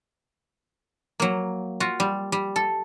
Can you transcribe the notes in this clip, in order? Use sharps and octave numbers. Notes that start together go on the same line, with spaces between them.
F#3 A#3
F4 F#4
G3
G3
A4